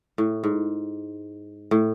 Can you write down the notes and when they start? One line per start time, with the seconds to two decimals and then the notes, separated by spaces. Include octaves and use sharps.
0.18 A2
0.44 G#2
1.71 A2